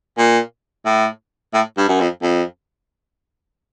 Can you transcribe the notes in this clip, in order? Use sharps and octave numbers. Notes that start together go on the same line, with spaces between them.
A#2
A2
A2
G2
F#2
F2
F2